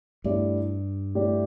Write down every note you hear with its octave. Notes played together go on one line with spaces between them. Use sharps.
G2 A3 E4 G4 D5
A3 E4 G4 D5